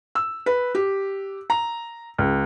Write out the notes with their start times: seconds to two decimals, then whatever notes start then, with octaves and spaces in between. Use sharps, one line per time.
0.15 E6
0.46 B4
0.75 G4
1.50 A#5
2.18 C#2